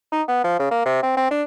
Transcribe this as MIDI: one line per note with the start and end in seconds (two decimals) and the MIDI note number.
0.12 0.22 63
0.28 0.39 59
0.44 0.59 53
0.59 0.68 49
0.71 0.85 58
0.85 1.00 48
1.02 1.16 60
1.17 1.27 60
1.31 1.42 62